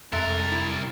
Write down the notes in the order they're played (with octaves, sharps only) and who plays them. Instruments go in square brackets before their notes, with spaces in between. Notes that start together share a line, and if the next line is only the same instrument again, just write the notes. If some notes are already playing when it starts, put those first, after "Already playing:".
[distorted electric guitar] C2 A#4 [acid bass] F2 [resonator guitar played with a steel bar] G#3 A4 E5 [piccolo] A6
[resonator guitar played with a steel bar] E4